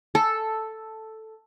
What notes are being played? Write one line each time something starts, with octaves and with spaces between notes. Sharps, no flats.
A4